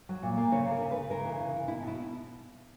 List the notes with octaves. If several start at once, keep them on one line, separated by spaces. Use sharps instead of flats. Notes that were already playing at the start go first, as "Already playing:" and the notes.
F#3
A#2
A#3
C#3 C#5
C#3
A#4
C#3
B4
C#3
C#3 A#4
E3
C#3
C#3
B2 E4
B2
E4